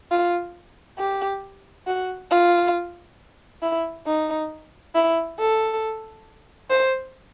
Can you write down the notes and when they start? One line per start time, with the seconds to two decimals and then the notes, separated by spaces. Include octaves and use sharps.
0.11 F4
0.98 G4
1.87 F#4
2.31 F4
3.62 E4
4.07 D#4
4.95 E4
5.38 A4
6.70 C5